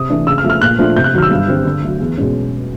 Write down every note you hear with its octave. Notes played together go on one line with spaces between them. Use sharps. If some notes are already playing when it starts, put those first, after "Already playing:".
Already playing: C3 D#6
E3 A3 D4
C#3 E6
F6
F3 A3
F6
A#2 F#6
F3 A3 D4
C3 G6
F#6
D#3 F#3 F6
E6
G2
D3 G3 C4
D3
F#3 A3
E2
B2 G#3 C#4